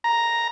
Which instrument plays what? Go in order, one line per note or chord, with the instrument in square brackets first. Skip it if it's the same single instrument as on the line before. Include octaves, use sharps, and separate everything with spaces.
[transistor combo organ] A#5